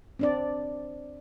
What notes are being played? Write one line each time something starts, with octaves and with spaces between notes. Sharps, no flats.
C4 D4 D5